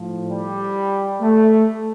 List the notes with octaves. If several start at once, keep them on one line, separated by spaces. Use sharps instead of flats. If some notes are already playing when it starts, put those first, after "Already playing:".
Already playing: A2 F3
G3
A3